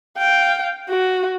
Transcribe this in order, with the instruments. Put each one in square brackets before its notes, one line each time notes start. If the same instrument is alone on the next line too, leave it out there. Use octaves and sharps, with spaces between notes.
[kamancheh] F5 G5
F#4